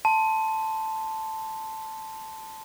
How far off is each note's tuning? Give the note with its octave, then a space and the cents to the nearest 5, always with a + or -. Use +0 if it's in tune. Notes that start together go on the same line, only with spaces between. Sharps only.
A5 +0 C6 -5